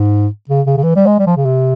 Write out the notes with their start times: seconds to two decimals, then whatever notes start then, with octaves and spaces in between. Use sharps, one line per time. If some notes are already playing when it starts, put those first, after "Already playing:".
Already playing: G#2
0.49 C#3
0.66 C#3
0.77 C#3
0.83 E3
0.96 G3
1.06 G#3
1.19 G3
1.27 F3
1.37 C#3
1.45 C3